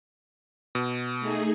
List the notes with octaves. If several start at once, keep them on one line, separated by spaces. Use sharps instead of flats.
B2
A3 D#4 G#4